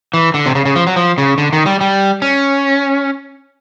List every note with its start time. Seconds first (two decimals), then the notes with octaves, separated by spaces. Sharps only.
0.14 E3
0.34 D3
0.46 C3
0.55 C#3
0.65 C#3
0.76 F3
0.87 F#3
0.96 F3
1.18 C#3
1.38 D3
1.53 D#3
1.66 G3
1.81 G3
2.22 C#4